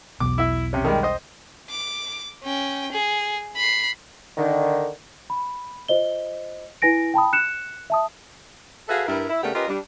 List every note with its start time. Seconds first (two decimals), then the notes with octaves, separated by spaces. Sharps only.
0.20 B1 E2 B2 D6
0.38 E4 E5
0.73 C3 C#4
0.85 D#3 G3 G#3
1.03 C5 D#5
1.69 D6
2.44 C#4 G5
2.92 G#4
3.56 B5 C7
4.37 D3 D#3
5.30 B5
5.88 F4 C5 D#5 G7
6.82 E4 B4 G#5 A#6 D7
7.14 G5 A5 B5 D#6
7.33 F#6 C#7 E7
7.90 E5 A5 D#6
8.88 F#4 G#4 A4 B4 E5 F5
9.07 G2 E4 A#4
9.29 E4
9.42 C#3 A3 B3 D4 G4 A#4
9.55 C#4 F4 G4 A#4 B4 D#5
9.68 G3 D4